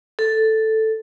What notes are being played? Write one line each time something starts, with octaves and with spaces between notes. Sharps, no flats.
A4